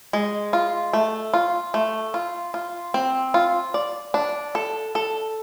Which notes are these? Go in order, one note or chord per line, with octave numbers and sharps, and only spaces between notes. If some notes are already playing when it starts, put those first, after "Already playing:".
G#3
F4
A3
F4
A3
F4
F4
C4
F4
D5
D4
A4
A4